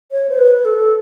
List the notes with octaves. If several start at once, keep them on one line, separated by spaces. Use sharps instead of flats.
C#5
C5
B4
A4